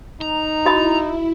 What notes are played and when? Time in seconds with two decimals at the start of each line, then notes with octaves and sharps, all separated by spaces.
0.21 D#4 A#5
0.66 E4 F#4 D#5 B5